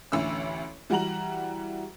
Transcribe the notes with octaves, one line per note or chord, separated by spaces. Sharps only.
A1 D2 E3 C#4 E4 E6
E3 G3 F#4 F#5 A#5 F#7